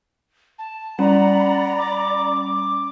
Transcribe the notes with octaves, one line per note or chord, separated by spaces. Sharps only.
A5
G3 C#4 D5 F#5 A#5 B5
D6